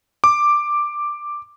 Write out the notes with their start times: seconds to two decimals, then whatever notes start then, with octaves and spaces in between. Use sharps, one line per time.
0.24 D6